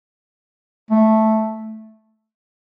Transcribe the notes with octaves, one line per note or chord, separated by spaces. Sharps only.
A3